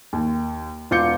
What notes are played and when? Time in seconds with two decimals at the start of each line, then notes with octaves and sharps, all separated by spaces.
0.13 D#2
0.91 E1 F4 D6 G6 C#7